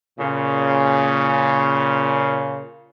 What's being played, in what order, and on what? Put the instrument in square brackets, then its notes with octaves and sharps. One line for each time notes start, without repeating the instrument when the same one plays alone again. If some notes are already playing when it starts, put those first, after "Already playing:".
[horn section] A#2 C#3